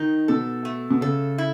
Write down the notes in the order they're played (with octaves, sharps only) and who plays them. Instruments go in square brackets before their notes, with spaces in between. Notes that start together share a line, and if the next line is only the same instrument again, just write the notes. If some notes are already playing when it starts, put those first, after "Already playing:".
Already playing: [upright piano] D#3 [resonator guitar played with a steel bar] D#4
[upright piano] B2 [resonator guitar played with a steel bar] A4
[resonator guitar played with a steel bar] A3
[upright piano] B2
[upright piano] C#3 [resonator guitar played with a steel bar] A4
[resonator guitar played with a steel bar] E4